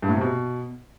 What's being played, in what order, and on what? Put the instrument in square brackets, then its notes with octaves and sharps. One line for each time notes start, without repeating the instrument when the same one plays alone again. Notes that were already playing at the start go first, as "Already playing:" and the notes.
[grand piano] G2
A2
C3
B2